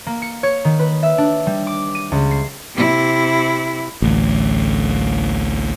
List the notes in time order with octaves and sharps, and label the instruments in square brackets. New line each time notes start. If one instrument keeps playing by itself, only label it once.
[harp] A#3
C#7
C#5
D#3
B4
E5
D4
G3
D6
D#7
C#2
C7
[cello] C3 E4
[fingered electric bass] A1 D2